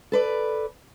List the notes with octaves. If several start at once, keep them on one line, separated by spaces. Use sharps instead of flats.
A4 B4 D5